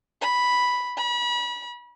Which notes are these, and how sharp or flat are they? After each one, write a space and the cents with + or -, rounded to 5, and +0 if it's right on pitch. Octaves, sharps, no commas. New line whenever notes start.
B5 +0
B5 -35